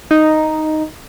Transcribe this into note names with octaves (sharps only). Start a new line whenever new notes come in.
D#4